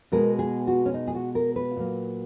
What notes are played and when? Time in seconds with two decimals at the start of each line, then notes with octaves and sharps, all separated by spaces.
0.12 B2 G#3 B3 A#4
0.39 G#4
0.67 F#4
0.86 C#4
0.94 D#4
1.07 G#4
1.15 F#4
1.35 A#4
1.56 B4
1.76 A#2 F#3 A#3